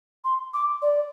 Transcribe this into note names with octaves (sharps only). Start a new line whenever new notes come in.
C6
D6
D5